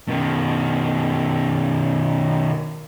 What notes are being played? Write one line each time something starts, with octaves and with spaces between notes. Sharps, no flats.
B2 D#3